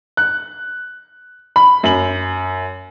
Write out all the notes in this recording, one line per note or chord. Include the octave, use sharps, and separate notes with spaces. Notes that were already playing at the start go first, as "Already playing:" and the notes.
F#6
B5
F#2 F#7